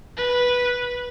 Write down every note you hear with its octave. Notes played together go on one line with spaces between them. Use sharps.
B4